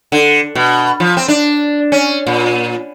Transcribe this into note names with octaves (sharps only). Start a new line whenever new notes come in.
D3
B2
F3
C4
D4
C#4
A#2